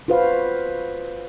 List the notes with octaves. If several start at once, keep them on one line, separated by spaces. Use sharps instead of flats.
F4 F#4 B4 C5 F5